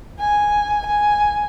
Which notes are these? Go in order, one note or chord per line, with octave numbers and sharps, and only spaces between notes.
G#5
G#5